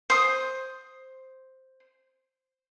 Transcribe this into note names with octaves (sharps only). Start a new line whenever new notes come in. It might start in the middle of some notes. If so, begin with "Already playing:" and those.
C5 D#6